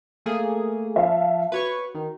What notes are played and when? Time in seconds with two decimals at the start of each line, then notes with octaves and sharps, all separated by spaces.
0.26 A3 A#3 G#4
0.96 F3 E5 F5 A5
1.52 F#4 B4 C#5 C#6
1.95 D#3